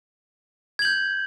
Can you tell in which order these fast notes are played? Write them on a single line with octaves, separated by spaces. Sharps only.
G#6 F#7 G6